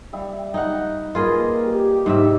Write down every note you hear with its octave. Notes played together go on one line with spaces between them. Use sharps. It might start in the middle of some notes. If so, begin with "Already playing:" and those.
G3 E5 F5
D#4 F#5
A#3 F4 G#4 B4 D#5
G4
G#2 C3 E5